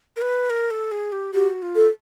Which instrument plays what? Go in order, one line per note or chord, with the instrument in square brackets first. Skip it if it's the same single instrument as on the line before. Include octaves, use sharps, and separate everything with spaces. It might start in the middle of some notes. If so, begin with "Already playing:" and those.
[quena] A#4
B4
A#4
A4
G#4
G4
[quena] F#4 [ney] G4
[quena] F4
[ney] A4